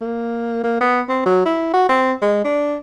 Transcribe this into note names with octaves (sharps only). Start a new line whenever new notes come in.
A#3
A#3
B3
C4
F#3
E4
F#4
C4
G#3
D4